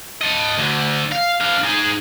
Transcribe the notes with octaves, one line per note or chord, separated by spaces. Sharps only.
A4 D#5
D2 D3
F5
D4 F5
D#4 G#4